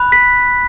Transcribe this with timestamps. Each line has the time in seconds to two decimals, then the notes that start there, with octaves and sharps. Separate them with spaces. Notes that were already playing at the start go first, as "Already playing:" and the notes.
Already playing: B5 F#6
0.12 B6